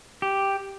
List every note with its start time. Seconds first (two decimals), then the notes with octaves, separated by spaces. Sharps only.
0.22 G4